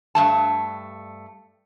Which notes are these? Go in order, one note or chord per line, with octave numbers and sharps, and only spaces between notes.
G2 A3 A5